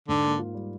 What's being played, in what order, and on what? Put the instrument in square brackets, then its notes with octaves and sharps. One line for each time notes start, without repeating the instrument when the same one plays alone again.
[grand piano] G#2 [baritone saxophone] D3
[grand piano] A#3
F4
G3